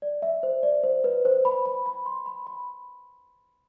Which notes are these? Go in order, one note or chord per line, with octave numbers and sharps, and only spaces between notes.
D5
E5
C5
D5
C5
B4
C5
B5
B5
B5
C6
B5
B5